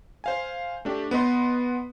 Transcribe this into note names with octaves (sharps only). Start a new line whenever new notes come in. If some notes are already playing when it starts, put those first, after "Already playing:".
C5 F5 G#5
A3 D4 G4
B3 B4 D#5 C6